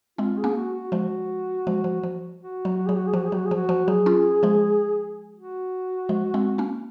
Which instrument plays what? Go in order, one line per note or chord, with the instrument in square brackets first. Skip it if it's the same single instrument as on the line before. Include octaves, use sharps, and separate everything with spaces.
[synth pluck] G#3 C4 [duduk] F4
[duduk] G#4
[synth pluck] A#3 C#4
[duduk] F#4
F#4
[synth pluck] F3 G#3 [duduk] F#4
[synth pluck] F3 G#3
F3
F3
[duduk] F#4
[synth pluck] F#3
[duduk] F#4
[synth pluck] F#3 [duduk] G#4
[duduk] F#4
G#4
[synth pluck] F3 [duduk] F#4
[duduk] G#4
[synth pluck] F#3 [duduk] F#4
[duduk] G#4
[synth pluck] F3 [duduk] F#4
[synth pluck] F3
[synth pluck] F#3 [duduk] G#4
[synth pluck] C#4 F4
F3 G#3
[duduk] F#4
[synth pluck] F3 G#3
G#3 C4
A#3 C#4